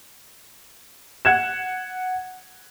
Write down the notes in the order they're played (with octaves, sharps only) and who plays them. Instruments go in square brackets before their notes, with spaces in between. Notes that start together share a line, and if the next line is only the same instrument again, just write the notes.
[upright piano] F#5 G#6 E7